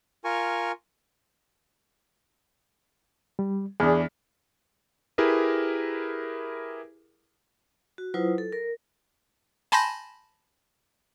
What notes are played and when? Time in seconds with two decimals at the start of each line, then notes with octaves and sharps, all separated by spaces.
0.24 F4 A#4 G#5 C#6
3.39 G3
3.80 E2 D4 G#4
5.18 E4 G4 G#4 A#4 B4
7.98 F#4
8.14 F#3 E4 F4 B4 C5 D#6
8.38 A4
8.52 A#4
9.72 G#5 A5 B5 C6 G6 A#6